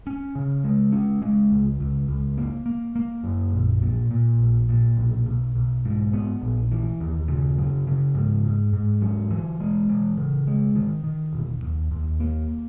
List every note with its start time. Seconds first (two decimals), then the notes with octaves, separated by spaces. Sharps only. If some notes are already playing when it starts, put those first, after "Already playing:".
0.07 C#4
0.35 C#3
0.64 G#3
0.92 C#4
1.22 G#3
1.51 C#2
1.80 C#2
2.08 C#2
2.38 A#3
2.66 A#3
2.96 A#3
3.24 F#2
3.53 A#1
3.82 A#2
4.11 A#2
4.39 A#1
4.69 A#2
4.97 B1
5.26 B1
5.56 B1
5.85 G#2
6.13 B3
6.42 A#1
6.71 E3
7.00 D#2
7.28 C#3
7.58 F#3
7.87 C#3
8.15 G#2
8.45 G#2
8.73 G#2
9.02 F#3
9.31 E3
9.60 G#3
9.89 E3
10.17 C#3
10.47 G#3
10.76 D#3
11.04 D#3
11.33 E1
11.63 D#2
11.91 D#2
12.20 A#3